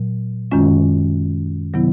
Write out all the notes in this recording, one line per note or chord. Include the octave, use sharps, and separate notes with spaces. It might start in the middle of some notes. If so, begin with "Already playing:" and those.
Already playing: A#2 F#3
F#2 D#3 G#3 C#4 F4
C3 D#3 F#3 B3 E4